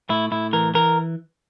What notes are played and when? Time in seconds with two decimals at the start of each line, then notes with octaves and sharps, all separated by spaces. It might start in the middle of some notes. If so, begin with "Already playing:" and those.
0.10 A2 E4
0.31 A2 E4
0.53 E3 A#4
0.74 E3 A#4